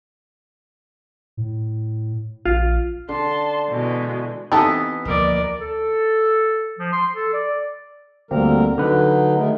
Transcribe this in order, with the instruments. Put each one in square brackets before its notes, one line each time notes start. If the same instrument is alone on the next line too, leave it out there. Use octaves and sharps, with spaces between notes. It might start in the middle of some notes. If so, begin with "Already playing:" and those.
[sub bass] A2
[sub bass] A#1 [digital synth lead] F4
[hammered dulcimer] D3 [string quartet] A5 C6
[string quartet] B2 E3 G#3
[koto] E3 B3 D#5 [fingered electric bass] C4 [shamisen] D#4 G4 A4
[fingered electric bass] D2 F3 A#3 [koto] B2 [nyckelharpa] A#4 D5
[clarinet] A4
F3
C6
A4
D5
[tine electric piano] D2 A#3 C4 [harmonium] D3 G3 A#4
[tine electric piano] D3 B4 [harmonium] F#3 D#4
[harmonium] D#3 G#3 A3